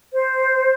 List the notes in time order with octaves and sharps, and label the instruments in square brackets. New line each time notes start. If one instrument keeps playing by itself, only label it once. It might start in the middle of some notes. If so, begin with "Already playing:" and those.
[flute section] C5